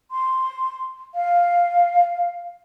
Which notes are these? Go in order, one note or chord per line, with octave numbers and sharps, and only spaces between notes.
C6
F5